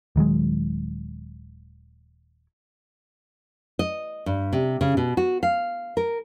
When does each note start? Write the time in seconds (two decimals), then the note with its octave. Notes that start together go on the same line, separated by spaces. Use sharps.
0.16 D#1 D#3 F#3 G#3
3.79 D#5
4.26 G2
4.53 C3
4.81 C#3
4.97 B2
5.17 F#4
5.43 F5
5.97 A#4